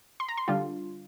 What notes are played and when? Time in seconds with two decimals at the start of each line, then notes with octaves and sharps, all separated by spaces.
0.20 C6
0.29 A#5
0.37 C6
0.48 D3 G3 D4 F4